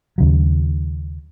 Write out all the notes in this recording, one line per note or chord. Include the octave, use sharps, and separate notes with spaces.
D#2 C#3 F#3